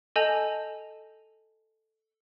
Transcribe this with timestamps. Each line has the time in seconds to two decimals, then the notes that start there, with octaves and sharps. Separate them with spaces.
0.16 A4 D#5 G#5 A5 G6 F7